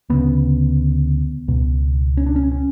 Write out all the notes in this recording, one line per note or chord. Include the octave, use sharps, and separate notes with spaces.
D2 C#3 B3
C#2 B2
C#4
D4
C#4
C#4